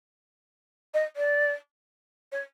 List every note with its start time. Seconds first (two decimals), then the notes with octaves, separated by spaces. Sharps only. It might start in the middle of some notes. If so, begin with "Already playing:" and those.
0.94 D#5
1.16 D5
2.32 C#5